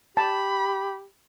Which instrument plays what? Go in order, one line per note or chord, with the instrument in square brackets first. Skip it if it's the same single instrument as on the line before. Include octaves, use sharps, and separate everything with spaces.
[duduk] G4 [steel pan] A5 [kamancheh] B5